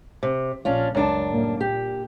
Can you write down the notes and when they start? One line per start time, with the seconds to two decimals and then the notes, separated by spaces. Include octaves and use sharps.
0.23 C3
0.65 A#1 C#4 D4 F4
0.95 C#2 F#2 D4 A5
1.29 A2 G3 A#3
1.61 A#2 G4